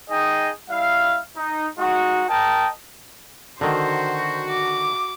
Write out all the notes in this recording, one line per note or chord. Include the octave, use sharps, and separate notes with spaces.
D#4 G#4 D#5 G5
G3 E4 F5
D#4
G#3 D#4 F#4
A#4 D#5 G5 A5
D3 D#3 F#4 C5
D6